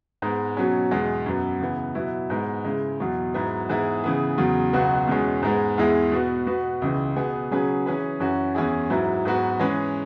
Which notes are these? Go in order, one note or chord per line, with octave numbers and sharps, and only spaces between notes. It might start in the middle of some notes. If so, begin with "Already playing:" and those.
G#2 G#3 B3
B2 F#3 C#4
E2 B2 G#3
F#2 F#3 B3
C#3 E3 B3
B2 F#3 E4 B4
G#2 G#3 B3
C#3 G#3 E4
E2 B2 F#3
G#2 F#3 B3 E4
G#2 E3 B3 E4 G#4
C#3 E3 B3 G#4
E2 C#3 F#3
C#2 B2 F#3 B3 F#4
E2 B2 G#3 C#4
G#2 G#3 B3
E2 E3 G#3 E4 G#4
B2 B3 F#4 B4
B2 B3 F#4 B4
C#2 C#3 E3
B2 B3 G#4
C#3 F#3 C#4 G#4 B4
E3 C#4 G#4 B4
F#2 E3 C#4 F#4
E2 E3 C#4 E4 G#4
G#2 F#3 E4 B4
G#2 F#3 B3 F#4 B4
E3 G#3 C#4 G#4 B4